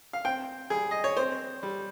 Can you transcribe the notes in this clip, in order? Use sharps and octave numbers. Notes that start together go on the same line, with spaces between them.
F5
C4 G5
G3 G#4
D#5
C#5
C4 C5
G3